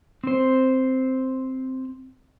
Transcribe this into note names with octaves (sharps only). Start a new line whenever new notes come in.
C4 C5